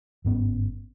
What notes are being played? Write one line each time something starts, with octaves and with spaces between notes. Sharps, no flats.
G1 G#2 B3 C#4